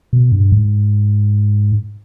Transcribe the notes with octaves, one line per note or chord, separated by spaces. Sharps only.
B2
G2
G#2